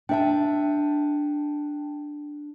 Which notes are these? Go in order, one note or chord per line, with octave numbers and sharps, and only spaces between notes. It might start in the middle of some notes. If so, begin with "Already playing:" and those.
D4 E5 G5 A5